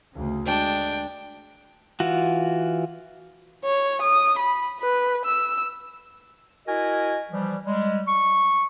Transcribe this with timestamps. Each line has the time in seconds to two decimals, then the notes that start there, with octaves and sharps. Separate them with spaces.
0.13 D2 C#3
0.46 G#3 D4 G5
2.00 E3 F4 F#4
3.65 C#5
4.02 D#6
4.39 B5
4.81 B4
5.25 E6
6.67 E4 F#4 A#4 D#5 G#5
7.31 E3 F3 G3
7.66 G3 G#3
8.07 C#6